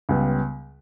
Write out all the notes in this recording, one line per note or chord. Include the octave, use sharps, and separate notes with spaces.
C#2 C#3 G3 B3